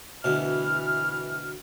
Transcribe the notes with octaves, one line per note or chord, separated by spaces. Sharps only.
D2 B2 E3 F6